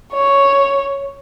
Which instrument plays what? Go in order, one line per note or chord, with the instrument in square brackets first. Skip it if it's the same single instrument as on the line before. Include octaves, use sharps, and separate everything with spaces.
[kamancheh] C#5